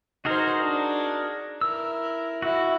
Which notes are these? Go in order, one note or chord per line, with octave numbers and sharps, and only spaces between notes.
D#4 F#4 G#4 A#4 C5
D4
E4 A#4 E6
E4 F#4